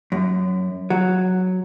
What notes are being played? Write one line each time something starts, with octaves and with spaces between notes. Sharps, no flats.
F#2
F#3